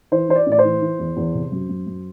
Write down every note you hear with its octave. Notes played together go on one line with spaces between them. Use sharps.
E3 C5
E3 C5
D5
A2
D5
C5
E3
E3
E2
E2
C3
F#2
F#2
F#2